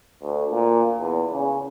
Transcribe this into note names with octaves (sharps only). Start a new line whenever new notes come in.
D2
A#2
E2
C#3